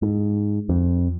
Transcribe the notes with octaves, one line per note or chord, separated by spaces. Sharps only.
G#2
F2